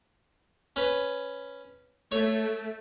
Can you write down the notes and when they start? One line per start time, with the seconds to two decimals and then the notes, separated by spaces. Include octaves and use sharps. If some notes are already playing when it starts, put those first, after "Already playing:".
0.76 C#4 B4
2.12 A3 C#5